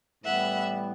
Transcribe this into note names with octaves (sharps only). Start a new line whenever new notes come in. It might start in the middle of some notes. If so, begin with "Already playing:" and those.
A2 E3 G3 B3 E5 F#5